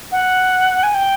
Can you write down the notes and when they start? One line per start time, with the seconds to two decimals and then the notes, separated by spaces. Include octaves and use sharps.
0.12 F#5
0.83 G#5
0.94 G5